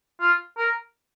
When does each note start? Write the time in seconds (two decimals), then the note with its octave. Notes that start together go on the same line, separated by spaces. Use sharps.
0.21 F4
0.58 A#4